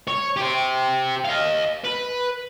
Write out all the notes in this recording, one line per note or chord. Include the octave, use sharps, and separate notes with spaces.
C#5
G4 C5
D#5 F5
B4